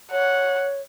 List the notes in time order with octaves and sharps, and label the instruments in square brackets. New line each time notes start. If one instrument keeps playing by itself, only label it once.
[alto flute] C#5 [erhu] F#5